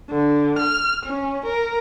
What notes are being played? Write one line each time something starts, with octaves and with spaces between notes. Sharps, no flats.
D3
F6
C#4
A#4